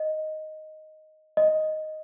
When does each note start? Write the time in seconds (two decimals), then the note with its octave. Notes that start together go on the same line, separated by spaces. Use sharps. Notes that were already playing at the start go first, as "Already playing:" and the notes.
Already playing: D#5
1.37 D#5